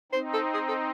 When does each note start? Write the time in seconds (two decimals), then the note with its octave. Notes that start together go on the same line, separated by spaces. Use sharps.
0.12 C4 D#4 C5
0.33 A4
0.54 G#4
0.68 A4